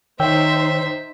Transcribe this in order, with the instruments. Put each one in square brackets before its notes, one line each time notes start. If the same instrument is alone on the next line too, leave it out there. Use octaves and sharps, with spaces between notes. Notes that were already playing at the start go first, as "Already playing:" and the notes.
[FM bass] D#3 [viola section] D#4 C5 [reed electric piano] C#5 G5 E6 [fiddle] E5